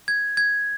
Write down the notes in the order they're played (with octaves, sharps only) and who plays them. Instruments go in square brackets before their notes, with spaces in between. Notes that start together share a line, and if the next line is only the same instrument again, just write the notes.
[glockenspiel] G#6
G#6